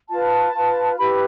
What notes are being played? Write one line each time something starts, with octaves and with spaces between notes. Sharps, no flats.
F4 B4 A5
F4 B4
E4 G4 B4 B5